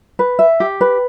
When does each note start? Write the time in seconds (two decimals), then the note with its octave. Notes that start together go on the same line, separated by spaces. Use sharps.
0.19 B4
0.39 E5
0.60 G4
0.81 B4